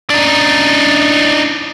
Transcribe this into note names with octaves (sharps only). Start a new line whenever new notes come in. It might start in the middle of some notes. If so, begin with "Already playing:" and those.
D4 D#4